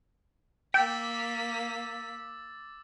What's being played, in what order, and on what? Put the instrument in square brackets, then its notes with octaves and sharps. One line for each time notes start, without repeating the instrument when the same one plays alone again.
[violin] A#3 B6 [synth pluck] G5 [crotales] D6 E6 A6